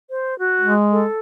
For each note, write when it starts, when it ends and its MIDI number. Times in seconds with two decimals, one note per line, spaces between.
0.10 0.37 72
0.39 0.73 66
0.61 1.04 56
0.92 1.20 69